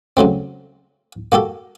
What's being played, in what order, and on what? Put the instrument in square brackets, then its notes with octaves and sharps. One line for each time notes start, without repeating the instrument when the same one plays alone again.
[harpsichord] C#3 F#3 A3 C4
A#3 F#4 G4 A4